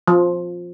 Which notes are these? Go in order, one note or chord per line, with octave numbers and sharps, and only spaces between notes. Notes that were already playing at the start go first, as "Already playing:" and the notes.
F3